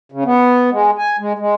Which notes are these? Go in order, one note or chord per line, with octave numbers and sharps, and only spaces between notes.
C#3
B3
G#3
G#5
G#3
G#3